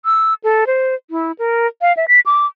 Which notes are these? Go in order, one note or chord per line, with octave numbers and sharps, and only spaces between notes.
E6
A4
C5
E4
A#4
F5
E5
B6
D6